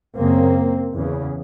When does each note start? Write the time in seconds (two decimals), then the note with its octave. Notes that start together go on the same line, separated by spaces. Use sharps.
0.17 F#2 C#3 A#3 C4
0.96 E2 C#3